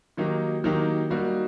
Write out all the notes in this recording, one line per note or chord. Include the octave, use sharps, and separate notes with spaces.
D#3 F#3 A#3 D#4 G4
D#3 F#3 A#3 D#4 G4
G3 A#3 D#4 F#4